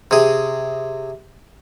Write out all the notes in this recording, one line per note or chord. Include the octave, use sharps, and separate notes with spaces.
C3 G#4